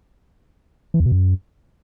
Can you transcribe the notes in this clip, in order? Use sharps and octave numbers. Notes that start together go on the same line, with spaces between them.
E3
E2
B2
F#2